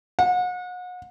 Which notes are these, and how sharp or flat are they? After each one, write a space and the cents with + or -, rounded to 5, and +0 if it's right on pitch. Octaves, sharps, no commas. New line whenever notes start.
F#5 -35